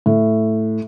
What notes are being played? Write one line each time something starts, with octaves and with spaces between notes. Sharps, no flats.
A2